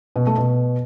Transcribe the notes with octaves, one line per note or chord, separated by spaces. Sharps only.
B2
A3
B2